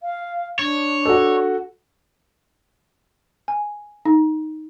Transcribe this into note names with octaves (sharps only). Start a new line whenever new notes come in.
F5
D4 C#5
F#4 A4
G#5
D#4